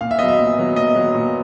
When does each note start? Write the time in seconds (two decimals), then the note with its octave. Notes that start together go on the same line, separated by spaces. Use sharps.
0.01 A#2 F5
0.11 E5
0.19 F#3 B3 D#5
0.28 E5
0.39 A#2
0.58 F#3 B3
0.76 A#2 D#5
0.96 F#3 B3
1.14 A#2